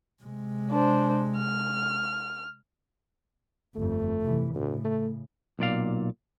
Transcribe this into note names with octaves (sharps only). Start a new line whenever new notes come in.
C3 G#3
D4 C5
F6
G1 F2 A3
C3 E3
D2 A2 C#3
A3
B1 A#2 D5 F5